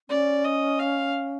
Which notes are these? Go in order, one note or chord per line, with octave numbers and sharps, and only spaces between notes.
C#4 D5
D#5
F5